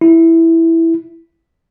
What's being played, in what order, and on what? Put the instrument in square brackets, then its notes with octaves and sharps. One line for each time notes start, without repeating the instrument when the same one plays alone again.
[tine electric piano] E4